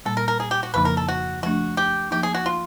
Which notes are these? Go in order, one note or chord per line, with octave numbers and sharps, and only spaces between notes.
A#2 G3 A#3 A4
A#4
A#4
G#4
G4
F#4
F2 C#3 F3 A#3 D#4 B4
A#4
A4
F#4
F3 A3 D4 F#4
G4
F3 A#3 D#4 G4
G#4
F#4
F4